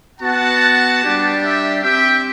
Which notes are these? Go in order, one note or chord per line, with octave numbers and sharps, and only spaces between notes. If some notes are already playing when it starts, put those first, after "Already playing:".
B3 F#4 F#5 A5
G3 D4 G4
E5 G5
C4 G4 E5 G5